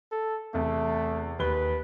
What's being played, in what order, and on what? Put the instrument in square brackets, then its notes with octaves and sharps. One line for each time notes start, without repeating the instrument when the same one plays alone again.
[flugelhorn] A4
[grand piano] E2 C3 [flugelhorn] A3
[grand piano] D#2 G7 [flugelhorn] B4